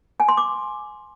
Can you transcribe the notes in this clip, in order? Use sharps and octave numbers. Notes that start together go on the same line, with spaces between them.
G#5
C6
D6